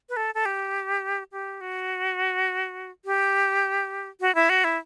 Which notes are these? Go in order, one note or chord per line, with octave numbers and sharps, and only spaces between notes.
B4
A4
A4
G4
G4
F#4
G4
F#4
E4
F#4
E4